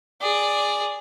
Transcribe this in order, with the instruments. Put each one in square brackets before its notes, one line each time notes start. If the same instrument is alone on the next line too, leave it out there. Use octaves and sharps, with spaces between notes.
[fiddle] G#4 D5